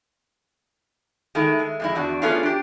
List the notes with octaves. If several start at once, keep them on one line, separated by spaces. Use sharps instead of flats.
D#3 G#3 A3 E4
G#3
F2 G#3 E4
E2 D4 F#4
A3 B3 C#4 D4 F4 G#4
D4 G4